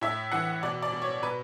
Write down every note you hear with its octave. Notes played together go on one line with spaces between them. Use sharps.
A2 E5
E3 F#5
B2 D5
D5
B2
C#5
B2 B4